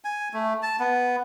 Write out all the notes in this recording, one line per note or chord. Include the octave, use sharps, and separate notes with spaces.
G#5
A3
A5
B3